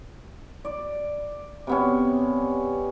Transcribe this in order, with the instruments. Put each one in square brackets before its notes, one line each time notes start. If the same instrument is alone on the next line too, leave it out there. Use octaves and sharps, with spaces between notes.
[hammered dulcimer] D5
C3 B3 C#4